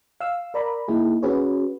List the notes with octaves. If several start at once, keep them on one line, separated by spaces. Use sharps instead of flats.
F5 E6
A#4 D5 A#5 B5
A#3 D#4 E4 G#4
C#4 F#4 G#4 B4 C#5